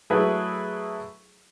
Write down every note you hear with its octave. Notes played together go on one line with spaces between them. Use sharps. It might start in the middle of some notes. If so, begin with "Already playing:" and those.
F#3 A3 E4 G#4 B4